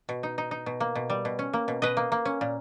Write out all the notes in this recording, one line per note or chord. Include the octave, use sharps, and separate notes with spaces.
B2
D#4
D#4
D#4
B2
A#3
B2
G3
B2
C#4
A#3
B2
B2 B4 D#5
A#3
A#3
C#4
A#2